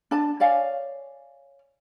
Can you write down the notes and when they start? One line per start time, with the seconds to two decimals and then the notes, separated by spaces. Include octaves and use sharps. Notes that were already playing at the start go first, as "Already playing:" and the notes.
0.11 D4 A5
0.40 C#5 D5 F5 G#5